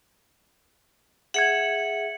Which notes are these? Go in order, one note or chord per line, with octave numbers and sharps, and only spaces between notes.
G#4 E5 F#5 G#6 C#7 F#7